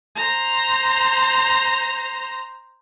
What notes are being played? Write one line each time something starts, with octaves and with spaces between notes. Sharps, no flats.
C5 A#5